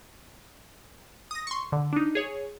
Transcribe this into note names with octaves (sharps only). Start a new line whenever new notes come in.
D#6 A#6
C6 C#6
D3
D4 D#4
G#4 C#5